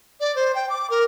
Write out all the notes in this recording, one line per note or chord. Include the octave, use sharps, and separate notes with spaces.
D5
C5
G5
D6
A#4